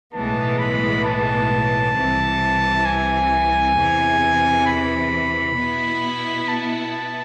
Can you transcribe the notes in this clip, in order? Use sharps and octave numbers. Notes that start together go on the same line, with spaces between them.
B1 A2 E3 G#3 B3 A5
B5
A5
C2 C3 E3
G#5
E2 C3 E3
B5
B2 B3 E4
A5